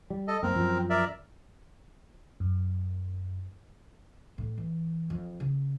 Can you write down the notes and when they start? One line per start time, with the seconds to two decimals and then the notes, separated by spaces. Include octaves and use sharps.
0.10 G3
0.28 A4 D#5
0.43 F#2 A#3 C4 A#4
0.55 F#2 F3
0.90 A#4 D5 E5
2.40 F#2
4.38 A2
4.58 E3
5.10 F2
5.40 C#3